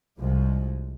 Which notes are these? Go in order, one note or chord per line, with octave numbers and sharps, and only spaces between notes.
C2 F3 G#3